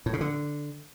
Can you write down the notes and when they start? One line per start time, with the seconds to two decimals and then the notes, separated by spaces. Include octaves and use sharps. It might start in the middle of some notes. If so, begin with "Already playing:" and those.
0.06 A2
0.13 C#3
0.21 D3